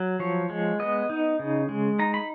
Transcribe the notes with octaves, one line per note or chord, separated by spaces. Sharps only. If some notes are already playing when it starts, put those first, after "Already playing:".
Already playing: F#3
F3 C#5
G#3
B3 D#5
D#4
C#3
G#3
D#4 A#5
B5